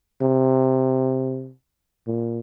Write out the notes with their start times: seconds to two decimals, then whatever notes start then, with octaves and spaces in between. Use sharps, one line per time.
0.22 C3
2.07 A#2